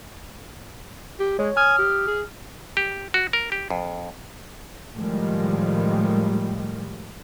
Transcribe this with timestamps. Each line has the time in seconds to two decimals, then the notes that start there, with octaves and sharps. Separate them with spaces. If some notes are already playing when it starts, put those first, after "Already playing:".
1.20 G4
1.39 G#3 C#5
1.57 G#5 D#6 F6
1.79 G4
2.08 G#4
2.77 G4
3.14 F#4
3.33 A#4
3.52 G4
3.70 F2
4.95 A2 D#3 F3 G3 G#3